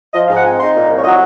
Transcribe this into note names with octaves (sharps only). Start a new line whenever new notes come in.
F3 D#5
F5
G#2
F#5
C4 G#5
D#4 C6
A#2
C2
C#5
F#3 D#5